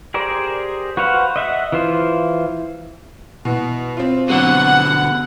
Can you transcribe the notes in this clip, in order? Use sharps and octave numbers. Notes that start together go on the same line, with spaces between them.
G4 G#4 A#4 C5 D5
F#4 B4 C5 F5 F#5
D#5 E5 F#5
E3 F4 C5
B2 E3 F#4
C4 F4
B2 D3 F#3 C4 D4 F#5